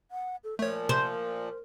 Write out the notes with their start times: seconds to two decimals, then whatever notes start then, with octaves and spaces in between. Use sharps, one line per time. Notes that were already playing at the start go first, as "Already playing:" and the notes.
0.11 F#5
0.44 A4
0.59 A#2 F3 A3 A#4 C#5
0.89 C3 C5